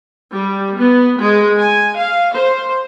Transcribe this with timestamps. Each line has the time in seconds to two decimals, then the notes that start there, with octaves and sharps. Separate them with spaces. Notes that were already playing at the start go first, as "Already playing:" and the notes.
0.32 G3
0.76 B3
1.19 G#3
1.59 G#5
1.97 F5
2.34 C5